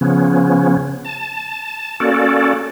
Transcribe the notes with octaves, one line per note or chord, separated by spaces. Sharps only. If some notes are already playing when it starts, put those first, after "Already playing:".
C#3 F3 B3 C#4
A5
A#3 C#4 F#4 A4 D5